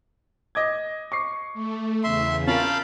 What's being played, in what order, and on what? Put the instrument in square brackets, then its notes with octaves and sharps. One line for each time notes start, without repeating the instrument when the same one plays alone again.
[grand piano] D#5 D6 G#6
C#6 D6 C7
[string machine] A3
[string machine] E2 C#3 [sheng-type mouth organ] E5 C6
[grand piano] C#4 F4 A#4 [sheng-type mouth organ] F5 A5 B5 [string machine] G6